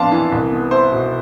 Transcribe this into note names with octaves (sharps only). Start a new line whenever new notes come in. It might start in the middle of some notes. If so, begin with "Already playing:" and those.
Already playing: F2 B3 D4 F5 A5 C6
E3
C2
B3
E4 C5
B2